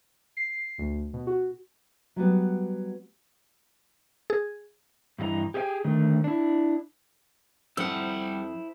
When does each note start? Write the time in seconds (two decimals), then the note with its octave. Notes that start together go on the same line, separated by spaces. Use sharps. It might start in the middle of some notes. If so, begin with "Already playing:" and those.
0.37 C7
0.78 D2
1.13 B2
1.27 F#4
2.16 F#3 G3 B3
4.30 G#4
5.18 G2 E3 F#4 D#5 A#5
5.54 G4 G#4 B4 E5 G5 G#5
5.84 D3 D#3 A3
6.24 D4 E4
7.77 F2 G3 E4 C5 F#5 E6